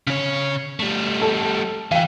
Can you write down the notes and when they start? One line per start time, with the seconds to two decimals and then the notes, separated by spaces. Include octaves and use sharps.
0.07 C#3 C#5
0.79 G3 A3
1.22 A4
1.92 E3 F5 G5